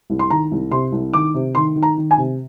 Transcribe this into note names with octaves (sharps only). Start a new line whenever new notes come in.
C2
C6
D#3 A#5
C2
C3 C6
C2
D#3 D6
C3
D#3 C6
D#3
A#5
D#3
G#5
C3